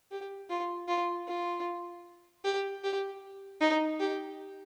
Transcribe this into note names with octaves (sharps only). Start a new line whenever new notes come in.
G4
F4
F4
F4
G4
G4
D#4
G4